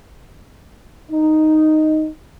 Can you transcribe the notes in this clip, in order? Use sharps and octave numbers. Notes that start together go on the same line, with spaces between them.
D#4